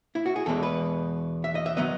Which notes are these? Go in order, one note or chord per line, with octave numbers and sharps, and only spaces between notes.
E4
F#4
G#4
E2 B2 G#3 A4
B4
E5
D#5
E5
D#3 F#3 B3 D#5